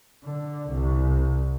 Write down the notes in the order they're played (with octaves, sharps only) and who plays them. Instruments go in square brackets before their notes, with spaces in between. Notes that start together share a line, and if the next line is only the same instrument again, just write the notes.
[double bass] D3
C2